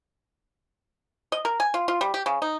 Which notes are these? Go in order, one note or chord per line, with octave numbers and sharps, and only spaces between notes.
D#5
A#4
G#5
F4
F4
G3
G4
C#3
D#4